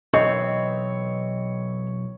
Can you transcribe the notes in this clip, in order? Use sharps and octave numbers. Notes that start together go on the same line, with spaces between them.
B1 E3 C4 C#5 D#5